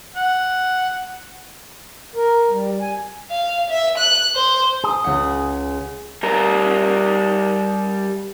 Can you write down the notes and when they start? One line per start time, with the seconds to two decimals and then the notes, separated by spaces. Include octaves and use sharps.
0.16 F#5
2.16 A#4
2.51 G3
2.81 G#5
3.31 F5
3.70 E5
3.98 F#6
4.35 C5
4.84 G#4
5.04 C#2 F#5
6.23 G3 A#4